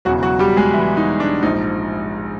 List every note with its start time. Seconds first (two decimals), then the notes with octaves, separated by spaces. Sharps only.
0.05 E1 E2 C#3 E3 F#3 F#4
0.22 F#3 F#4
0.39 G3 G4
0.57 G#3 G#4
0.74 E3 E4
0.97 D#4
1.20 D4
1.43 A#1 G#2 F3 D#4